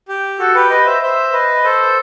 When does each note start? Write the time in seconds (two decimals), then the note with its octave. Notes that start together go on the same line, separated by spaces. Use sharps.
0.08 G4
0.39 F#4 A4
0.55 G4 B4
0.70 B4 D#5
0.86 C5 E5
1.02 C5 E5
1.32 B4 D#5
1.64 A4 C5